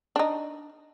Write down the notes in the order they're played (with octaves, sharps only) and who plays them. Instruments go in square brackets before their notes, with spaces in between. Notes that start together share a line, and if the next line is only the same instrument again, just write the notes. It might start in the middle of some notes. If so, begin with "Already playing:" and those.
[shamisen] D4 D#4